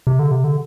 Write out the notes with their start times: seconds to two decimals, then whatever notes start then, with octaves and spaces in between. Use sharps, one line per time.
0.07 C3
0.19 D3
0.31 C3
0.44 D3